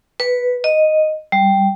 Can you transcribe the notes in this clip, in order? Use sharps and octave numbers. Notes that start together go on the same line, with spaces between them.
B4
D#5
G3